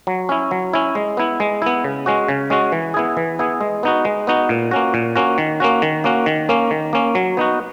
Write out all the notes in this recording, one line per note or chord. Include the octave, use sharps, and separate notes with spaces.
F#3
C#4 E4
F#3
C#4 E4
G#3
B3 E4
G#3
B3 E4
C#3
G#3 C#4 F#4
C#3
G#3 C#4 F#4
E3
B3 E4 G#4
E3
B3 E4 G#4
G#3
B3 D#4 F#4
G#3
B3 D#4 F#4
A#2
A#3 C#4 F#4
A#2
A#3 C#4 F#4
D#3
A#3 C#4 F#4
D#3
A#3 C#4 F#4
D#3
A#3 C#4
D#3
A#3 C#4
F#3
B3 D#4 F#4